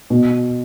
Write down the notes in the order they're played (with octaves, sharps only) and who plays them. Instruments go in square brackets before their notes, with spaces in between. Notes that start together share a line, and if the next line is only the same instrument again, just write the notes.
[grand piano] B2